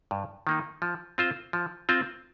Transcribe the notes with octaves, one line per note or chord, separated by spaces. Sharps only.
G2
D#3 A#3 D#4
F3
C4 F4 C5
F3
C4 F4 C5